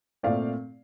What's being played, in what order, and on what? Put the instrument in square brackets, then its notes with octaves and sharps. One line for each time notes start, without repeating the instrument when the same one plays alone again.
[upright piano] A#2 A3 C4 D5 F5